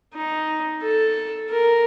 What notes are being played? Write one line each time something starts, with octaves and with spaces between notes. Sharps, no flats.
D#4
A4
A#4